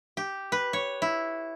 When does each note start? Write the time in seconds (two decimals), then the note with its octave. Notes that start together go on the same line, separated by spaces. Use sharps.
0.17 G4
0.52 B4
0.73 C#5
1.02 E4